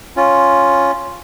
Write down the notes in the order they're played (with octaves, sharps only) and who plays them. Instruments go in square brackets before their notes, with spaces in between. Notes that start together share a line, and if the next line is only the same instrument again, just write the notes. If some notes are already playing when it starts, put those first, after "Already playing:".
[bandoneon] C#4 F4